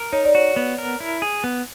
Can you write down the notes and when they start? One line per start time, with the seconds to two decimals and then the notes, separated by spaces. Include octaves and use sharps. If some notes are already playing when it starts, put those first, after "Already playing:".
Already playing: A#4
0.13 D#4 C#5
0.25 D5
0.35 F#4 C#5
0.56 B3
0.78 A#4
1.00 E4
1.22 G#4
1.44 B3